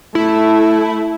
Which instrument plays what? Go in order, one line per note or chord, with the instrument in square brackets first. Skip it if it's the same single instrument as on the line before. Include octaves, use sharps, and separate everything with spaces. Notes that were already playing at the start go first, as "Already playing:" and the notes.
[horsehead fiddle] A3 [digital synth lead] E4